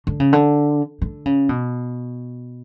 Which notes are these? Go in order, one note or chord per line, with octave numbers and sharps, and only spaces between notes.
D3
C#3
D3
D3
C#3
B2